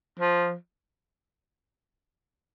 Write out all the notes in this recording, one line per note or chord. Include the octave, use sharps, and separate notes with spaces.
F3